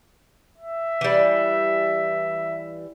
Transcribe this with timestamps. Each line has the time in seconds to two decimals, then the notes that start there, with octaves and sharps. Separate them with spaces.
0.57 E5
1.01 E3 G3